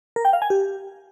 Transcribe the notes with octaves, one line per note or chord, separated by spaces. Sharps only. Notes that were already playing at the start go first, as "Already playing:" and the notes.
A#4
G5
F5
G#5
G4